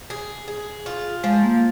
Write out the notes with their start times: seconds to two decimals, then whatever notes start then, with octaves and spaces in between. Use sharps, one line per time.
0.10 G#4
0.48 G#4
0.86 F4
1.24 F3 G#3
1.43 A#3